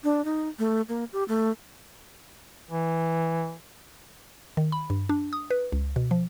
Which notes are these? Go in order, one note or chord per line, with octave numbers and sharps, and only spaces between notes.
D4
D#4
A3
A#3
G4
A3
E3
D#3
B5
G2
D4
D#6
B4
C#2
B2
F3